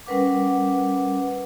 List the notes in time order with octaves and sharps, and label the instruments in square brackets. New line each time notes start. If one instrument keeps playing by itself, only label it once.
[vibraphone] G3 C#4 A#4 B4 F#5 D6